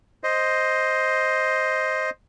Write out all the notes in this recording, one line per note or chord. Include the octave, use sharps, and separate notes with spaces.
C5 D#5